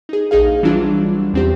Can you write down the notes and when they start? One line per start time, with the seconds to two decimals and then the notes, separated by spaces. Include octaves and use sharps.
0.09 D#4 G#4
0.31 A#1 D#4 G#4 F5
0.63 E3 F#3 G3 D4 F4
1.33 E2 C4 G4